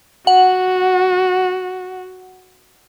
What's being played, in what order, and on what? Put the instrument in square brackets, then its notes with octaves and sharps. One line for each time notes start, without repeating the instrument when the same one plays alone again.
[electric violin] F#4 [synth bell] F#5